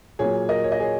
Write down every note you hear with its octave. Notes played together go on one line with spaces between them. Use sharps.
A#2 F#3 A#3 G#4 C#5
A#4 D#5
C#5
D#5
G#4 C#5